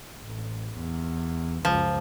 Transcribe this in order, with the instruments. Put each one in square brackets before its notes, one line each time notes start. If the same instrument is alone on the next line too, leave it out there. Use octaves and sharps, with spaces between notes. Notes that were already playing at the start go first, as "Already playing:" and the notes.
[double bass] A1
E2
[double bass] C#2 F#2 [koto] F3